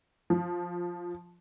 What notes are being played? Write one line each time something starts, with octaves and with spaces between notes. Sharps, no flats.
F3